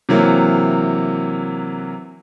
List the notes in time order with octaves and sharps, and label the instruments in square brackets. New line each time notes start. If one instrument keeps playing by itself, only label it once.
[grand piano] C3 E3 F#3 A#3